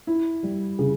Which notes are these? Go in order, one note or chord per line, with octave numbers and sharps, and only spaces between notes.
E4
G3
C#3